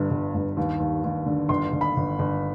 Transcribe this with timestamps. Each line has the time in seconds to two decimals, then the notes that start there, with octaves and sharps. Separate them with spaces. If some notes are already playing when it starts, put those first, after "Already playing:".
Already playing: G1 G2
0.10 G1
0.34 G2
0.57 D#2
0.80 D#2
1.04 D#2
1.26 D3
1.49 G1 C6
1.72 G1
1.81 B5
1.96 G1
2.19 G1